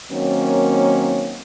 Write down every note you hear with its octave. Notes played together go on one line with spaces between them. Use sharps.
D#3 F#3 A#3 C4 C#4